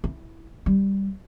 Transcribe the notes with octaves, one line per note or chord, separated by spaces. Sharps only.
E4
G3